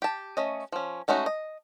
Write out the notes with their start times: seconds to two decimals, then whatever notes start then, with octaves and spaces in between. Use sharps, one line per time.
0.02 G4 A5
0.37 A3 C#4 D#5
0.72 F3 C#4
1.08 G#3 A3 C#4 D#4 F#4
1.26 D#5